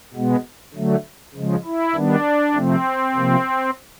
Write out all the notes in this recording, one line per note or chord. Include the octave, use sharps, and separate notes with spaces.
B2 G#3 B3
D3 F#3 A3
C#3 F3 G#3
E4
D#3 G3 B3 D4
C3 F3 A3 C4
C3 F3 A#3